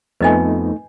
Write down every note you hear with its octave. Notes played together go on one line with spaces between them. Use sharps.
F2 F3 A3 B3 D#4 B4 D#5 G#5